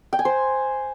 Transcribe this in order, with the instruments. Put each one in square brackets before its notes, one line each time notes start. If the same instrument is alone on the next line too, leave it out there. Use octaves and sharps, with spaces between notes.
[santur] G5
G#5
C5